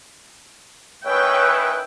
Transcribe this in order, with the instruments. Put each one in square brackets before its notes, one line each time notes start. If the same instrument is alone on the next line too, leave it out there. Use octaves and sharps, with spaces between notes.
[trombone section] D#3 C#4 E4 [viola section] B4 G5 [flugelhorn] C#5 [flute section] E6 F#6